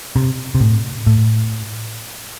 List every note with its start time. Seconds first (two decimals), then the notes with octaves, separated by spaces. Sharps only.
0.16 C3
0.55 C3
0.61 A2
1.07 A2